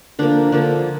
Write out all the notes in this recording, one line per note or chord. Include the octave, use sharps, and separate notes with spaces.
D3 F3 A#3 D4
D3 F3 A#3 D4